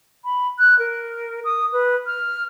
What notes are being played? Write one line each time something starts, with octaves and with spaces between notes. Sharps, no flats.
B5
F#6
A#4
D#6
B4
F6